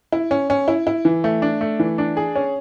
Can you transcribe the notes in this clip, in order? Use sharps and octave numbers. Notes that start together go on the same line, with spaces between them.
E4
C#4
C#4
E4
E4
E3
A3
D4
A3
E3
D4
G#4
C#4